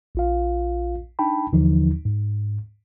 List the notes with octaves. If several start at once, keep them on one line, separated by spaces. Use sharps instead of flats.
A#1 F4 F5
D4 D#4 G5 A5 B5
D#2 D3 E3 F3 D#4
G#2